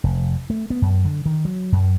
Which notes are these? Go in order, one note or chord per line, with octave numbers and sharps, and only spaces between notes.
F1
A3
B3
F#2
D3
D#3
F#3
F#2